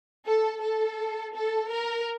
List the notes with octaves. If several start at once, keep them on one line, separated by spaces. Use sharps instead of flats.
A4
A4
A4
A#4